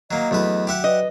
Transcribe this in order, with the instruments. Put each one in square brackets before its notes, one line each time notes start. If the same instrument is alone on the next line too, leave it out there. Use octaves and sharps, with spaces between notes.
[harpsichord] F#3 A#3 [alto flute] D#5
[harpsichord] E2 A3 B4 [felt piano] F#3 F#4
[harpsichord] G4 E5 F#5
[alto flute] B4 [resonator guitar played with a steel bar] D#5